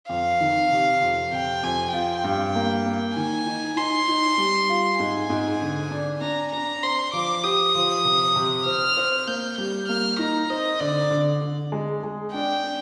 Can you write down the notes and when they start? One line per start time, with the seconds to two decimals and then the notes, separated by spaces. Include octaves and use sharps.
0.09 F2 F5
0.41 D#3
0.71 C3
1.02 F2
1.32 C3 G5
1.63 F2 G#5
1.93 F4 G5
2.24 G2
2.55 A#3
2.86 A#3
3.15 D#3 G#5
3.46 D#4
3.76 D#4 C6
4.08 D#4
4.38 G3
4.69 F4
5.00 G#2 G#5
5.30 G#2
5.61 D3
5.91 D4
6.21 D4 A#5
6.52 D4 A#5
6.83 C4 C6
7.13 F3 D6
7.44 G4 D#6
7.75 F3
8.05 C3
8.36 C3
8.66 C4 F6
8.97 C4
9.27 A#3 G6
9.58 G3 G6
9.88 A#3 F6
10.19 D#4 A#5
10.50 C4 D#5
10.80 D3 D5
11.10 D3
11.41 D3
11.72 G#3
12.03 G#3
12.33 D4 G5
12.63 D4